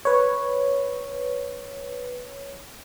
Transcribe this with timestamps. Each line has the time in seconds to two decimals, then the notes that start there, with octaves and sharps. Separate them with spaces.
0.05 B4 C#5